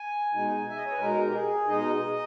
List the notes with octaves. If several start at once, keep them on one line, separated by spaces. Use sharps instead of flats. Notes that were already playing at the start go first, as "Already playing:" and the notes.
Already playing: G#5
B2 G#3 D#4
E5
D#5
C#5
B4
B2 G#3 D#4 A#4
G4
G#4
B2 G#3 D#4 D#5